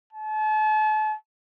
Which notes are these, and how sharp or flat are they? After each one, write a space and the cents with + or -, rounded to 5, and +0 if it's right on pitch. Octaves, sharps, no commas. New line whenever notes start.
A5 -40